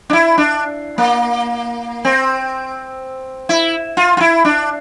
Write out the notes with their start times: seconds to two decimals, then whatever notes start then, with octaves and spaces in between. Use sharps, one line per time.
0.10 D4
0.13 E4
0.38 D4
0.98 A#3
2.05 C4
3.49 E4
3.97 F4
4.17 F4
4.21 E4
4.45 D4